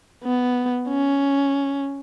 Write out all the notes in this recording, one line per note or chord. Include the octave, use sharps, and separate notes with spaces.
B3
C#4